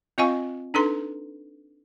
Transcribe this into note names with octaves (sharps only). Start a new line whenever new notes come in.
C4 F4 D#5 F5 G#5 C#6
D4 D#4 A4 B4 A#5 C6